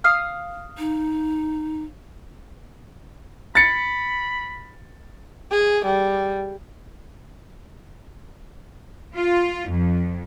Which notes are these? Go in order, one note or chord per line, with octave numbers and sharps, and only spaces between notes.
F5 D#6 F6
D#4
B5 A6 C#7
G#4
G3
F4
F2